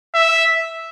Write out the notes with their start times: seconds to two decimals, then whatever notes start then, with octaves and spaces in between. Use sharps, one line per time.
0.15 E5